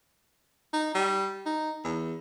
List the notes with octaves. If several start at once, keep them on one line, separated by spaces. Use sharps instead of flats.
D#4
G3
D#4
E2